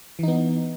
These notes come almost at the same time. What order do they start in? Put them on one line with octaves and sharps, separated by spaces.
E3 D#4 B3